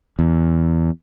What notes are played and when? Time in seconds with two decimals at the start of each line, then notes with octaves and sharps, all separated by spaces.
0.19 E2